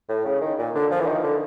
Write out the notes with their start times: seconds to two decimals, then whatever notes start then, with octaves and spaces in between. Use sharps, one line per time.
0.09 A2
0.25 C#3
0.41 D#3
0.58 A#2
0.75 D3
0.91 F3
1.00 E3
1.07 D#3
1.23 D3